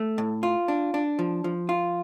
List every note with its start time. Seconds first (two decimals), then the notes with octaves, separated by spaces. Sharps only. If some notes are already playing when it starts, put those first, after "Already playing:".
Already playing: A3
0.18 A2
0.43 F4
0.68 D4
0.94 D4
1.19 F3
1.44 F3
1.69 F4